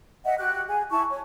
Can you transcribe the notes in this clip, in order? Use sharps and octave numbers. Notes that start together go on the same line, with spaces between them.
D#5 E5 F#5
F#4 G4 F#6
G#4 G#5
E4 A5 C#6
C#5